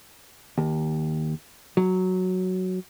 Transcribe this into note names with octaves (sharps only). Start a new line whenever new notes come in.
D#2
F#3